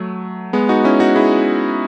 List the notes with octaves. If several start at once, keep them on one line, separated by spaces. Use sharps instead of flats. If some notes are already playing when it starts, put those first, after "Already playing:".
Already playing: F#3 A3
G#3 B3
D#4 F#4
C#4 E4
D#4 F#4
E4 G#4